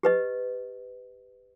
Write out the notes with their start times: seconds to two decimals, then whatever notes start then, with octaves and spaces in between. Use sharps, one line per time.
0.03 G4 B4 D#5